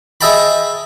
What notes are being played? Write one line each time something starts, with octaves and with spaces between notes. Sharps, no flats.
G#4 D#5 E5 G5 A5 B5